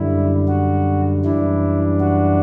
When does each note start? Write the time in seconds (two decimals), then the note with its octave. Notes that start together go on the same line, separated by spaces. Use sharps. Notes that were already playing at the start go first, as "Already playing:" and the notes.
Already playing: F#2 D3 G3 E4
0.48 F#4
1.24 F#2 E3 G3 D4 E4
2.00 F#4